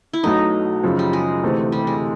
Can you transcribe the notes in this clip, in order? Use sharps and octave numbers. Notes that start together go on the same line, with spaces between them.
E4
B1 B2 F#3 A3 D#4
F#2 C#3 F3
G3
G#3
D2 C3 E3 A3 C4
G3
G#3